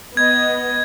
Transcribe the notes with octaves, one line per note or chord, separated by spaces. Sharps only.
B3 D#5 G#6